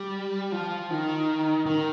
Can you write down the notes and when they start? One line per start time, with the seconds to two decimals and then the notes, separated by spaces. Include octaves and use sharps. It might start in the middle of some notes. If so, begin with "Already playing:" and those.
Already playing: G3
0.52 F3
0.90 D#3
1.66 D#3